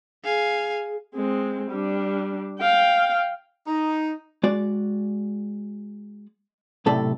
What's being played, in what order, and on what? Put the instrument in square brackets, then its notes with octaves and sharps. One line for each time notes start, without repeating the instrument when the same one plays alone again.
[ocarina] G#4 [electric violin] F5 G#5
[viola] G#3 C4
G3 D4
F5 G5
[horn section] D#4
[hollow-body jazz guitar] G#3 F#4 D5
B1 A2 C3 A4 D5 E5